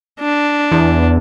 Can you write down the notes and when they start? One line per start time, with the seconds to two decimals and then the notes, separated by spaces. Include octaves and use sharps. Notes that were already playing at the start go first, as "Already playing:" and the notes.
0.20 D4
0.71 E2